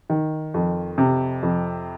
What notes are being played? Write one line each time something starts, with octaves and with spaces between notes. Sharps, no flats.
D#3
F2
C3
F2